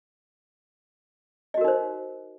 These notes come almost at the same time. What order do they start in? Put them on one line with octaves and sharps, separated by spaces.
D#5 F#4 A#4 D#4 C5